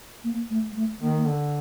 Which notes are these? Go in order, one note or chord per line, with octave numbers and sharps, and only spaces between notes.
A#3
A3
G#3
A3
D#3 A#3
D3